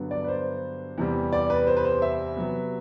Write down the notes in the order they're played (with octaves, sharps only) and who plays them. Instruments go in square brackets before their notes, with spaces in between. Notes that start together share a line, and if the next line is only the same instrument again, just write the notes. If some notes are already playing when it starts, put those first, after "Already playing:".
Already playing: [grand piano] G2 D3 F#3 B3
D5
B4
C5
E2 C3 G3
D5
B4
C5
B4
C5
E5
C3 F#3 B3